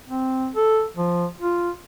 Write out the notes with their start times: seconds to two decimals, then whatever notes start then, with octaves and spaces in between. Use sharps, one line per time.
0.07 C4
0.55 A4
0.97 F3
1.41 F4